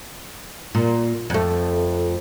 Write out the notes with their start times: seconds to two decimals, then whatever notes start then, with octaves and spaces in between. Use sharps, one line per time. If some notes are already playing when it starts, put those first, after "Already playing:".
0.75 A#2
1.30 F2 A3